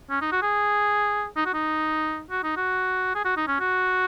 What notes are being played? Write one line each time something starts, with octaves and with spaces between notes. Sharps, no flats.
C#4
D#4
F#4
G#4
D#4
F#4
D#4
F#4
D#4
F#4
G#4
F#4
D#4
C#4
F#4